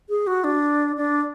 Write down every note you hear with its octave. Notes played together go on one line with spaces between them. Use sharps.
G#4
F#4
D4
D4